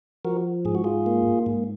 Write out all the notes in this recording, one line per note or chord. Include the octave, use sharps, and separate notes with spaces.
F3 F#4 A#4
G#2 G#4
F#4
F4 G#4
A#3
G#2